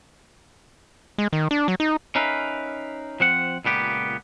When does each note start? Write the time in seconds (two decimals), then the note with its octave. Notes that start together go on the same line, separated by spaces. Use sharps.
1.18 G#3
1.33 D#3
1.51 D4
1.68 F#3
1.80 D#4
2.15 C#4 D#4 A#4 B4 E5 F5
3.20 F3 C4 F#5
3.65 C#2 A#2 B3 G4